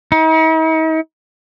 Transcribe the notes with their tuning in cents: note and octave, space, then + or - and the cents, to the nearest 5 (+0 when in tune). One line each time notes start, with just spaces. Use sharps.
D#4 +45